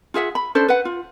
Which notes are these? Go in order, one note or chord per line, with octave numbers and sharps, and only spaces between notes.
F4 G#4 E5 F#5
B5
C#4 D4 A4 C5
B4 F#5
F4